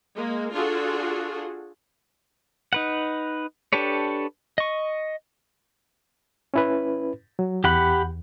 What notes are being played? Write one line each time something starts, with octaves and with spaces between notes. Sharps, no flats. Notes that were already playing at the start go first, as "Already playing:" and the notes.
G#3 A#3
D4 F4 F#4 G#4 A4
D#4 B4 F#5
D4 G4 A4 B4 C#5
D#5 C#6
C#4 E4 B4
F#3
E2 G4 F#5 B5